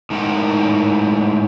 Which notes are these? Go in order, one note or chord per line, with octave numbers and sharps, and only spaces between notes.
A2 G#3 D#4 A#4 F#5 G5